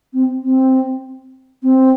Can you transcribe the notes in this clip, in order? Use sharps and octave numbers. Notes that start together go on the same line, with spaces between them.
C4
C4
C4